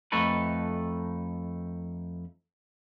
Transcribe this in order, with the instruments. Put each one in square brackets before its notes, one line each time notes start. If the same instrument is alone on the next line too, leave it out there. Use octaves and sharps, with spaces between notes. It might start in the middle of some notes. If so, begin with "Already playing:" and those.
[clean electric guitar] F2 A3 D#4 A4 B4